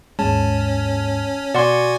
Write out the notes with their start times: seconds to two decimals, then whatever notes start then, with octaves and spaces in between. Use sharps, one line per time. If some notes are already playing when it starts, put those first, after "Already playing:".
0.19 D#2 G#2 G#3 C#4 A5
1.54 B2 F#4 D5 F#5 G#5 C6